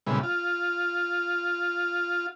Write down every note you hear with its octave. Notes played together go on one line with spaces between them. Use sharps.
A#2 C#3 G3 G#3 B3 E4
F4